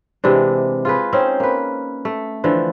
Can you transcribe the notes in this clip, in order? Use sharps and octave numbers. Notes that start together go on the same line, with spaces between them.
C3 E3 G#3 D4
F4 G#4 B4
C4 C#4 D#4 C5
A#3 B4
A3
D3 E3 F3